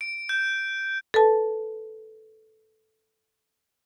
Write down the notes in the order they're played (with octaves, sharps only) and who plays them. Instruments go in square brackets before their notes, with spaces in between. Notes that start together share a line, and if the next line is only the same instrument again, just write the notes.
[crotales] D7
G6
[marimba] A4 B4 A5